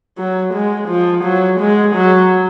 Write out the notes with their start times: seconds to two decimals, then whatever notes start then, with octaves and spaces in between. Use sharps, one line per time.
0.18 F#3
0.54 G#3
0.89 F3
1.24 F#3
1.60 G#3
1.96 F#3